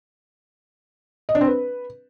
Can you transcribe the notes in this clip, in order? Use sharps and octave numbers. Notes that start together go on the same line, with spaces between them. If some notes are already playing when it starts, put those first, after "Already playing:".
D#5
D4
C4
B4